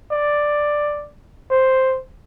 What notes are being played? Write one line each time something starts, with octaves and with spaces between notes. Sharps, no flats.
D5
C5